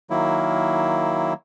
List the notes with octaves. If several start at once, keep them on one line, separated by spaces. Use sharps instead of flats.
D#3 F#3 A#3 E4